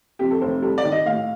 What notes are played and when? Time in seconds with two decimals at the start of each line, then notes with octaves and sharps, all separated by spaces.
0.19 F2 G4
0.31 A4
0.41 F1 C5
0.62 G3 A4
0.78 D5
0.84 D#3
0.92 D#5
1.06 A2 F5